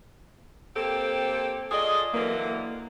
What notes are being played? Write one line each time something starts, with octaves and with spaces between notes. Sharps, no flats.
A#3 C4 G4 A4
F4 G#4 A4 D5 D#5
D3 E3 F#3 A#3